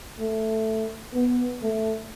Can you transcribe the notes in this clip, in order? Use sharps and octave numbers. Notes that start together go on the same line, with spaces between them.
A3
B3
A3